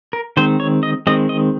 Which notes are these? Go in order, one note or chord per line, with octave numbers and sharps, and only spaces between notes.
A#4
D#3 G#3 C4 C5
C#5
D#5
D#3 G#3 C4 D#5
D#5